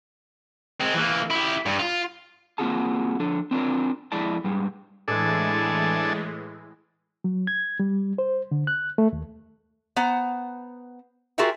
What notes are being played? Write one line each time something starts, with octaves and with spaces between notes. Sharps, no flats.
G#3 C4
E3 A#3
E4 G4
G2
F4
A#3 C4 F4 F#4 G#4 A5
F3 D4 A4
C4 D4 F4 A#4
F2 G#3 E4 D5 A5
G#2 G3 G#3
A2 E3 G#3 D4 G#4 A4
F#3
G#6
G3
C5
D3
F#6
A3
D#2
B3 C5 F#5 A#5
F4 F#4 G#4 A#4 E5 G5